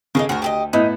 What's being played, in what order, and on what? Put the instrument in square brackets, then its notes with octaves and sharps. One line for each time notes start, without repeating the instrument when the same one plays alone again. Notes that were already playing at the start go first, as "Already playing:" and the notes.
[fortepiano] C#3 [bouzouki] A#3 A4 D#5
[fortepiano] D2 [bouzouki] F#4 A#4
[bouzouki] G4 G#4 D#5
[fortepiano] A2 B3 E4 [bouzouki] D#4